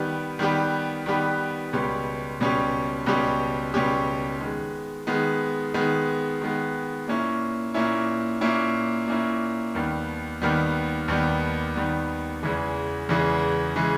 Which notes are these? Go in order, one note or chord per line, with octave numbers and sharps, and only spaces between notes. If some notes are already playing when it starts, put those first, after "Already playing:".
Already playing: D#3 G3 B3 G4 B4
D#3 G3 B3 G4 B4
D#3 G3 B3 G4 B4
C#2 B2 G3 C#4 G4
C#2 B2 G3 C#4 G4
C#2 B2 G3 C#4 G4
C#2 B2 G3 C#4 G4
D#3 G#3 B3
D#3 G#3 B3
D#3 G#3 B3
D#3 G#3 B3
A#2 A#3 C#4 E4
A#2 A#3 C#4 E4
A#2 A#3 C#4 E4
A#2 A#3 C#4 E4
D#2 D#3 G3 B3
D#2 D#3 G3 B3
D#2 D#3 G3 B3
D#2 D#3 G3 B3
E2 C#3 E3 G#3
E2 C#3 E3 G#3
C#3 E3 G#3